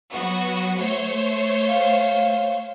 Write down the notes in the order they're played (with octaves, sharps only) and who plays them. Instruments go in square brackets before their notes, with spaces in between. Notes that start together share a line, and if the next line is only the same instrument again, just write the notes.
[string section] F#3 B3 F#4
A3 C5 C#5
[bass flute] F5